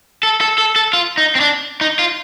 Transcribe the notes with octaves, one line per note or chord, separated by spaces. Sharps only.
A4
A4
A4
A4
F4
D#4
C4
D4
D#4
F4